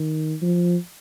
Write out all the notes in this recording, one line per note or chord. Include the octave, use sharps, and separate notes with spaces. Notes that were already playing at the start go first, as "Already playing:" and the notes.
Already playing: D#3
F3